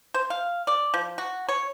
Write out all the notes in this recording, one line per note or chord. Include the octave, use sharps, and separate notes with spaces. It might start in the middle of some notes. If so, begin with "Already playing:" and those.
C5
F5
D5
F3
F#4
C#5